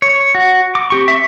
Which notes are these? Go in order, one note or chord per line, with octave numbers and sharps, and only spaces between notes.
C#5
F#4
D6
C4 G4 C#6
E5 C#6